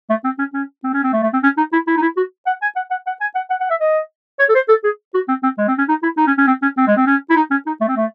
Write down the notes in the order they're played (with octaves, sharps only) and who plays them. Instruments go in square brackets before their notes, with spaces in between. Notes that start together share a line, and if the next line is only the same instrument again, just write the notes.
[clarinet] A3
C4
C#4
C#4
C4
C#4
C4
A3
A3
C4
C#4
D#4
E4
E4
D#4
E4
F#4
F#5
G#5
F#5
F#5
F#5
G#5
F#5
F#5
F#5
E5
D#5
C#5
A4
C5
A4
G#4
F#4
C4
C4
G#3
C4
C#4
D#4
E4
D#4
C#4
C#4
C4
C#4
C4
G#3
C4
C#4
E4
D#4
C#4
D#4
A3
C4
A3